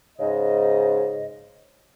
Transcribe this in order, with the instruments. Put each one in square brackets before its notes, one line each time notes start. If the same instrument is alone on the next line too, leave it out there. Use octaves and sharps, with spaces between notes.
[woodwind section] G#2 C#3 D#5